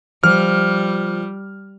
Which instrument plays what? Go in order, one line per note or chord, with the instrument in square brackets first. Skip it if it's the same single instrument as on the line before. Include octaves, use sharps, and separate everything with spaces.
[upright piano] F3 [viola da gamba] G3 [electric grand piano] F6